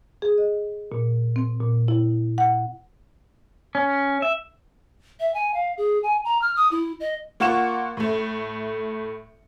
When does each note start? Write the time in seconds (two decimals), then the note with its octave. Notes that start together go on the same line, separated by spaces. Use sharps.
0.22 G#4
0.38 D#5
0.92 A#2
1.36 C4
1.61 A#2
1.88 E4
2.38 F#5
3.75 C#4
4.22 E5
5.20 E5
5.34 G#5
5.54 F5
5.78 G#4
6.03 G#5
6.25 A#5
6.41 F6
6.56 D#6
6.71 E4
7.00 D#5
7.40 A#3 F4 F#5 C#6 E7
7.97 A2 A3